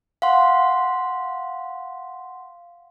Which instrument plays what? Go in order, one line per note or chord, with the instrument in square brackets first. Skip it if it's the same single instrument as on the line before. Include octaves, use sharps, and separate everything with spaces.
[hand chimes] F5 F#5 C6